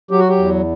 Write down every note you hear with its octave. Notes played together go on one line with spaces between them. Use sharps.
F#3 G4
F#4
G4
E2